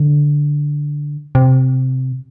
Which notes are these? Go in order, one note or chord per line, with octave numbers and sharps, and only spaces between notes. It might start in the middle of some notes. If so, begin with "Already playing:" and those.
Already playing: D3
C3